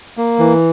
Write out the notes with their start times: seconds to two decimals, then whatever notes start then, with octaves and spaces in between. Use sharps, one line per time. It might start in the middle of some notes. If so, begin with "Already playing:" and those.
0.17 A#3
0.39 E3